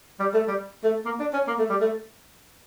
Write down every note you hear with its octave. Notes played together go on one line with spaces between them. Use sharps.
G3
A3
G3
A3
A#3
D4
C#4
A#3
A3
G3
A3